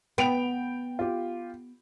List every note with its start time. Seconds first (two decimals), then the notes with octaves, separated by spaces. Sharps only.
0.18 B3 G5 D7 F7
0.99 F4 G4